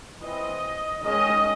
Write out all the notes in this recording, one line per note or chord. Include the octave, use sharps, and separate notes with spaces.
E3 C4 D#5
D#3 G#3 C#4 D#5